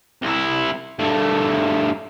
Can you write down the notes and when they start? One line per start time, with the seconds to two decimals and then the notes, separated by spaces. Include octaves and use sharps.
0.22 C2 E4
0.99 G2 A3